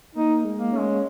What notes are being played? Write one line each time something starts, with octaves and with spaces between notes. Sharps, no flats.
A#3 D#4
G#3
A#3
C#4
G#3